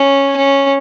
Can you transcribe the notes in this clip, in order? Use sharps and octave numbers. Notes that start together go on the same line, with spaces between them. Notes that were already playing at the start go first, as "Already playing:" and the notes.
Already playing: C#4
C#4